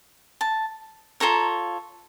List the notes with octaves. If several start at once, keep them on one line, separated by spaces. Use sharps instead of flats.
A5
F4 A4 C#5 A#5